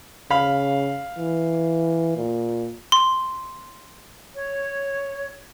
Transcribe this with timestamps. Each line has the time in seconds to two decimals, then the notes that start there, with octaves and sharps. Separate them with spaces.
0.31 C#3 F5 B5
1.18 E3
2.17 A#2
2.92 C6
4.34 C#5